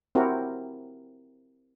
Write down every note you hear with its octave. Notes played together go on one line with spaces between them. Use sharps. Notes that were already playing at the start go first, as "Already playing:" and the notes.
C4 E4 F#4 G4 A#4